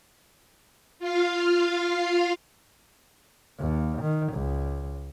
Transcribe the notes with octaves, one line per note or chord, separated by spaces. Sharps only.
F4 F5
D#2
D#3
C#2